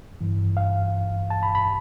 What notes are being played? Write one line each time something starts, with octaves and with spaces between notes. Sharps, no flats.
G2 E3
F5
A5
B5
B5